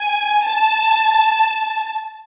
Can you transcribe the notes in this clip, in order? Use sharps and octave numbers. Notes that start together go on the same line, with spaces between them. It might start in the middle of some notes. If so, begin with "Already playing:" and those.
Already playing: G#5
A5